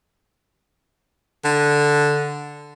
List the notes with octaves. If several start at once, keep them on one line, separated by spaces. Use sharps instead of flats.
D3